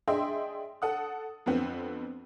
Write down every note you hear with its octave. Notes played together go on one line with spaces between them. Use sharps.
D4 G#4 D#5 E5 G5 C6
A4 F#5 D#6
F2 D3 B3 C4